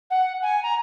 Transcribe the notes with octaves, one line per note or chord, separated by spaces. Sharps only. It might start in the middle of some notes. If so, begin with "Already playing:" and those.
F#5
G#5
A#5